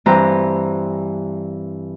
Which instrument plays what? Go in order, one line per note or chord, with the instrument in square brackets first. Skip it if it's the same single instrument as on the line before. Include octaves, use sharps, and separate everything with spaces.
[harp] G2 E3 C4 G4 A#5